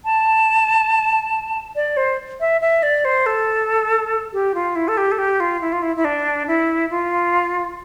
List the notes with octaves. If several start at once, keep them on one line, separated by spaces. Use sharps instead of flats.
A5
D5
C5
E5
E5
D5
C5
A4
G4
F4
E4
A4
G4
A4
G4
F4
E4
F4
E4
E4
D4
E4
F4